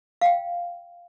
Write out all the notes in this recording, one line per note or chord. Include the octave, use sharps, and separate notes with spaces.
F5 G5